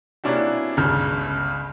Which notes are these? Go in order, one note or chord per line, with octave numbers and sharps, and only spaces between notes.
C3 A#3 C#4 D4 E4 F#4
G1 C#2 C#3 F6 G6